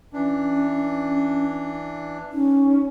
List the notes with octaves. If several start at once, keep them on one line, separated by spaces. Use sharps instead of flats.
E3 C#4 D4
C#4 D#4